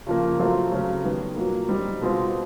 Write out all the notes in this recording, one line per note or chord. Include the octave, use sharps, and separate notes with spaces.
C#3 F3 A#3
F#3 A3 C4 F4
C#3 F#3 A3 C#4
D#3 G3 B3
A#2 F#3 A#3
G3 C4 D#4
B2 G#3 C4 F4